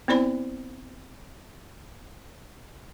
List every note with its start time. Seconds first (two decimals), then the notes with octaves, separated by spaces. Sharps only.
0.08 B3 C4 E4 C5 D5 B5